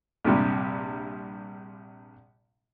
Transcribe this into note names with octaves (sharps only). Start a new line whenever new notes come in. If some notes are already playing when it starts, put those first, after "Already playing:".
A#1 G2 C3 G3